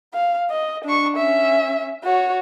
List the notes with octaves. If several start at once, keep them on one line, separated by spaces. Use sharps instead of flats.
F5
D#5
D4 C#6
C#4 E5
F#4 C#5